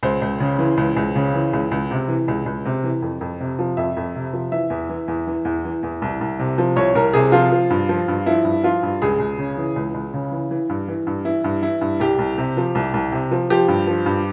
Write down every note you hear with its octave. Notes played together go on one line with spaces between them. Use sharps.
C#2 C5
C#2
C#3
E3
C#2
C#2
C#3
E3
C#2
C#2
C3
E3
C#2
C#2
C3
E3
F2
F2
C3
F3
F2 E5
F2
C3
F3
E3 E5
E2
E3
E2
E3
E2
E3
E2
C2
C2
C3
F3
C2 C#5
C2 A#4
C3 G#4
F3 F4
F3
G2
F3
G2
F3 E4
G2
F3 F4
G2
C#2 G#4
C#2
C#3
E3
C#2
C#2
C#3
E3
E3
G2
E3
G2
E3 E4
G2
E3 E4
G2
C2 G4
C2
C3
F3
C2
C2
C3
F3
F3 G4
G2
F3
G2